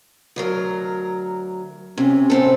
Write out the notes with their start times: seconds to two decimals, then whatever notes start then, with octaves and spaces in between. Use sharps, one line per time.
0.36 D2 F#3 A#4
1.98 C3 C#4
2.30 A2 C4 A4